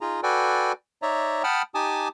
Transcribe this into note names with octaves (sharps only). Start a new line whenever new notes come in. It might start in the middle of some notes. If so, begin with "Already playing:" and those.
D#4 F4 G#4 A#5
F#4 A4 B4 D5 G5 G#5
D#4 C#5 D5 E5 A#5
F#5 G5 A5 B5 D#6 F6
D#4 G4 G#5 A5 D6 D#6